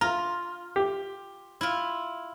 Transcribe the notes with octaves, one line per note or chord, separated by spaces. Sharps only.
F4 A#5
G4
E4 F4